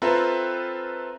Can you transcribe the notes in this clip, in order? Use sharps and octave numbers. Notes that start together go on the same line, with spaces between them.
C4 F4 A4 B4 E5 A#5